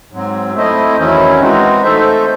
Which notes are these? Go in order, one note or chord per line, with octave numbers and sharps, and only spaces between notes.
G#2 F#3 C4
A3 C4 E4 C5 D#5
E2 D#3 F#3 C#4 E4
E3 G#3 C4 D#4 F#4
A3 D#4 A4 C5 E5